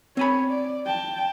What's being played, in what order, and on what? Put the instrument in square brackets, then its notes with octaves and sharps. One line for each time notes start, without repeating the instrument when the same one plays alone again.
[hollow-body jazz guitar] C4 G#5 B5 [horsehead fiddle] C#5
[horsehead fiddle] D5
G5 A5